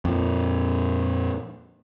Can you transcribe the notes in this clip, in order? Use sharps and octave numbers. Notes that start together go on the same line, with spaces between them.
F2 A#2